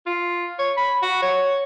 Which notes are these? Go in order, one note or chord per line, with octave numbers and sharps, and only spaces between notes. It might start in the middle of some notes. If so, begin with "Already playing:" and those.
F4
C#5
B5
F#4
C#5